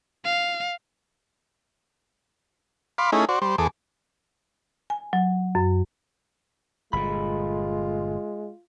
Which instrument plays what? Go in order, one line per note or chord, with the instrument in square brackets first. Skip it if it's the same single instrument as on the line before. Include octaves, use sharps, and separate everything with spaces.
[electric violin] F5
[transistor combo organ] F5 B5 C6 D6
A3 C#4 D#4 E4 G#4
F#4 C5 D5
G3 C5
E2 G#4 A4 D6
[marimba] G#5
F#3
F#2
[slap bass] G1 A#2 [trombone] G#3 [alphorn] F4 [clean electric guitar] B5